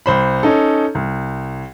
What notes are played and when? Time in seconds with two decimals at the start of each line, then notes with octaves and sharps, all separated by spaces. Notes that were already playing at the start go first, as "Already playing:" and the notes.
0.06 C2 C5 B5
0.43 C#4 D#4 A4
0.95 C2